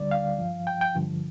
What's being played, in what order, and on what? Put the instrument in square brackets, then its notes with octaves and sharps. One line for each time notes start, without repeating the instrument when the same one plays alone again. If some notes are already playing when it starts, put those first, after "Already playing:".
Already playing: [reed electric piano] D2 D3 G3 D5
F5
G2 F3
G5
G5
G2 D3 F3